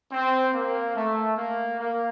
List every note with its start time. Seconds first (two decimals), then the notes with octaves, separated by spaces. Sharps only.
0.12 C4
0.54 A#3
0.95 A3
1.36 A#3
1.78 A#3